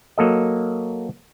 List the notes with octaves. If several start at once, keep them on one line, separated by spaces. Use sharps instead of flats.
F#3 A#3 A4 D#5